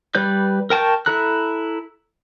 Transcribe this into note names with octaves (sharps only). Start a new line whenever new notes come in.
G3 B4 D5 G6
A#4 G5 A5 C#6 G6
E4 A4 A#5 F#6